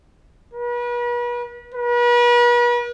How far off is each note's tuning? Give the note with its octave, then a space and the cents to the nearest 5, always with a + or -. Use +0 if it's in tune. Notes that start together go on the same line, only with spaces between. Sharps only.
B4 -40
B4 -40